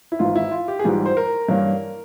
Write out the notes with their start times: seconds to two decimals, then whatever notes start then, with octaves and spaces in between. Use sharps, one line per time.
0.12 E4
0.19 G#1 G#2 E3 F4
0.36 E4
0.51 F4
0.68 G4
0.79 G#4
0.84 A#1 G#2 E3 G3 G4
1.06 C5
1.17 A#4
1.49 G2 E3 A#3 C#4